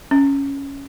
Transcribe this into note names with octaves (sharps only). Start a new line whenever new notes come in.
C#4